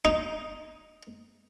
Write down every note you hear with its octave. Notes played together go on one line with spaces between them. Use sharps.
D#4